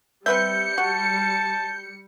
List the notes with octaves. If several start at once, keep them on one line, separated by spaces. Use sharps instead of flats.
G3 C4 B4 E5 G6 C#7
F#4 A5